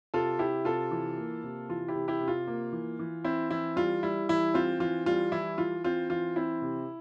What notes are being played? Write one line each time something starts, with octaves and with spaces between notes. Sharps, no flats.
C3 F4 A4
C3 E4 G4
C3 F4 A4
E3
A#3
C3
E3 F4
E4 G4
C3
E4 G4
C3
F4
A#3
E3
E3
C4 E4
E3 E4
G3 F4
G3 E4
E3 E4
C4 F4
E3 F4
G3 F4
E3 E4
E3 F4
C4 F4
E3 F4
C4 E4
C3